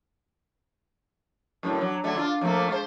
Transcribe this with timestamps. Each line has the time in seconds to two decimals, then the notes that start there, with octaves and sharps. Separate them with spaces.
1.63 F#2 A2 D3
1.81 F#3
2.04 D3 F#3 A3
2.16 D4 F4
2.41 F2 A3 A#3
2.69 G#3 C5